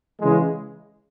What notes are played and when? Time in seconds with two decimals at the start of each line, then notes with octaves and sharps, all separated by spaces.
0.20 C#3 E3 G#3